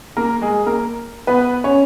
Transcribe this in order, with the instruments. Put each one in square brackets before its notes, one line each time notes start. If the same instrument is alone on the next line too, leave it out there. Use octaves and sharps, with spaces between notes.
[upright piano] A#3 A#4
G#3 G#4
A#3 A#4
B3 B4
C#4 C#5